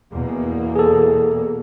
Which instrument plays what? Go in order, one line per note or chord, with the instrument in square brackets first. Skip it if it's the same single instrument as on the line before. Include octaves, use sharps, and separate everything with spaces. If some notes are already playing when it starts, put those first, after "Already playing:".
[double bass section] E2 B2 A#3
[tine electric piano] G#4 A4